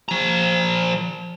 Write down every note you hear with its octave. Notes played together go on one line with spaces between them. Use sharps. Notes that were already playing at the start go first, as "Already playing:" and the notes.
F3 A#5